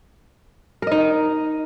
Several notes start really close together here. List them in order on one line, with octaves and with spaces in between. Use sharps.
A#4 D#5 D#4